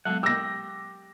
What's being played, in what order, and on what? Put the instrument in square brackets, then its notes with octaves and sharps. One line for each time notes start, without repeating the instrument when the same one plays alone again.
[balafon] F#3 G#3 B3 [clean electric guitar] A4 F#5
[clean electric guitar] G4 [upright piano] E6 A#6